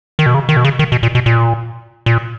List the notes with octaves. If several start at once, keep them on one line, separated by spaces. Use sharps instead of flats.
D#3
B2
C#3
D#3
B2
C#3
D#3
B2
A#2
B2
A#2
A#2